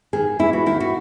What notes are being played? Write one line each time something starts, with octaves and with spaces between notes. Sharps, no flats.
D#3 G#4
E2 E4
F#4
D#3 E4
F#4